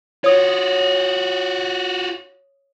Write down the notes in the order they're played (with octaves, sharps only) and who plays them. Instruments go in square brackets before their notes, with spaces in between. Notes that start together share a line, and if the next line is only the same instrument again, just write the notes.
[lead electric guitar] F4 F#4 [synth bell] C#5 D#6